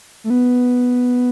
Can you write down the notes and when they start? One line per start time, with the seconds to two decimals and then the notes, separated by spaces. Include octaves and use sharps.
0.24 A3
0.30 B3